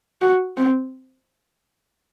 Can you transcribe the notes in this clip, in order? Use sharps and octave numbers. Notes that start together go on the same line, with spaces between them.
F#4
C4